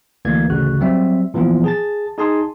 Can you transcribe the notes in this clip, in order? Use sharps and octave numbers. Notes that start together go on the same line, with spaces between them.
D2 E3 A#3 G#6
A1 D2 C#3 F#4 F#6
F#3 G3 C4 E5
A#2 E3 F3 B3 F4
G#4 A5 A6
D#4 G#4 G#5 A5 C6 D#6